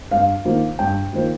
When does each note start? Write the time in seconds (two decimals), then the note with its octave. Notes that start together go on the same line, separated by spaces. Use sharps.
0.11 G2 F5
0.45 D#3 A#3 F4 C5
0.79 G2 G5
1.13 D#3 A#3 F4 C5